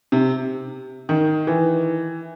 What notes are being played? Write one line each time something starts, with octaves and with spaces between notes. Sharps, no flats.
C3
D#3
E3